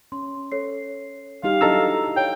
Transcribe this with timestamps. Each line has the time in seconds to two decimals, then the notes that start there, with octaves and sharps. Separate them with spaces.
0.12 C#4 C6
0.52 A4 C#5 C7
1.44 G3 D#4 G4 F5
1.61 F#3 D4 E4 A4 D#5 A#5 E6
2.17 C#5 F5 G5